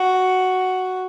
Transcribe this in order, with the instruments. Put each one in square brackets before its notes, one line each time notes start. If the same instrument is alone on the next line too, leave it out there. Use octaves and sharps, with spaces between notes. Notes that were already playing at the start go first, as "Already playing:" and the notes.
Already playing: [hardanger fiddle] F#4